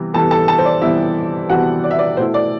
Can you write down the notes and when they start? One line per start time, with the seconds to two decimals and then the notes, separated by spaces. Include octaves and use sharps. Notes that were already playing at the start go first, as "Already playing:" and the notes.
Already playing: C3 E3 G3 B3
0.14 C3 E3 G3 B3 A4 A5
0.31 A4 A5
0.48 A4 A5
0.58 C5
0.65 D5
0.82 C3 E3 G3 B3 E4 E5
1.50 C3 E3 G3 B3 F#4 F#5
1.84 D5
1.91 E5
1.99 D5
2.17 B2 A3 E4 C5
2.34 D5